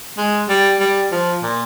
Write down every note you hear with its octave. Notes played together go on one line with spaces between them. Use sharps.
G#3
G3
G3
F3
A#2